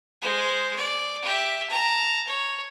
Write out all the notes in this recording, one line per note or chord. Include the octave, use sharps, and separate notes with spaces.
G#3 C5
D5
G4 E5
A5 A#5
C#5